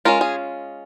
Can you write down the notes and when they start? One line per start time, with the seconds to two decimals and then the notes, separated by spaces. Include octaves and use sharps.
0.05 G#3 C#4 F4 A#4
0.21 G#4